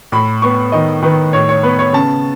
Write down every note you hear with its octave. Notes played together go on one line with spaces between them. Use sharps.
A2 B5
B3 C#6
D#3 D#5
D#3 B4
A2 C#5
C#5
B3 B4
C#5
C#3 A5